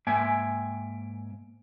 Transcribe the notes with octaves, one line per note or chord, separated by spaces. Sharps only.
G#2 A#3 E5 G5 G#5